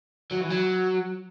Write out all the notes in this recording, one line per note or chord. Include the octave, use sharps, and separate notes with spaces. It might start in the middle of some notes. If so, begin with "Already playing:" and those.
F#3
E3
F#3